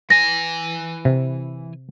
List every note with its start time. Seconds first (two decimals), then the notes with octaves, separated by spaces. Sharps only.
0.10 E3 G#5 A#6
1.05 C3